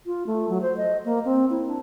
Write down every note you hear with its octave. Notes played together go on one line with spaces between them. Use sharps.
F4
A3
F#3
C5
D#5
A#3
C4
E4
D4